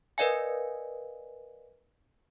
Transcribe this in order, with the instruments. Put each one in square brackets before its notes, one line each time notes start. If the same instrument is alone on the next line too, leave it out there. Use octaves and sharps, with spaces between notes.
[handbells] A#4 B4 D5 D#5 F5 G#5